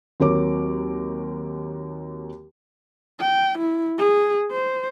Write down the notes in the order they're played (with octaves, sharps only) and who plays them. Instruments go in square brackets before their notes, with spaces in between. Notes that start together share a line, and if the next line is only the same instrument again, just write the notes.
[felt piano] D#2 F#3 C4 A#4 C#5 D6
[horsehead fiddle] G5
E4
G#4
C5